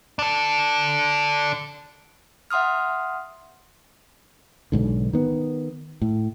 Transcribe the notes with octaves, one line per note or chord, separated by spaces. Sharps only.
D4 A4
E5 F#5 C6 D#6 F6
B1 G#2 D3
D#3 B3
A2